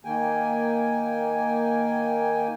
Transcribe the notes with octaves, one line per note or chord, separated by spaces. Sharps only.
D#3 A#3 G5 G#5